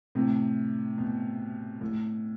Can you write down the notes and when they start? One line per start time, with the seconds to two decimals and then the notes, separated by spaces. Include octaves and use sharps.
0.15 A2 C3
0.98 B2
1.81 A2